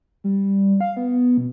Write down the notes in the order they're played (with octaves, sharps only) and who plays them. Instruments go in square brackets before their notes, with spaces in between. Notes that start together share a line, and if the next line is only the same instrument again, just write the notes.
[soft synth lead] G3
F5
B3
B2